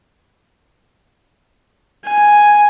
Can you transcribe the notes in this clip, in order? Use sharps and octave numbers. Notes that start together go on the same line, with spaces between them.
G#5